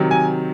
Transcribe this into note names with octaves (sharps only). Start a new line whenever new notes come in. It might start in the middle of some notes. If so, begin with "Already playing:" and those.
Already playing: C3 D#3 F#3
G#5